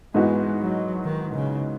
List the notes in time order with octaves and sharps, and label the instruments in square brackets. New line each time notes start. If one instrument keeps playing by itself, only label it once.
[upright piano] G#2 E3 B3 D#4 F#4 [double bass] G#3
[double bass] F#3
D#3
C#3